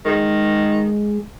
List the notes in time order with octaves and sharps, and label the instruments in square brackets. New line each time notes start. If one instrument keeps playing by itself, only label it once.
[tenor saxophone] D#3 [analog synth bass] G#3